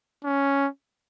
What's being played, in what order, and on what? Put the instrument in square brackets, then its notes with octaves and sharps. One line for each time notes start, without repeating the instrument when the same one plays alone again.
[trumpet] C#4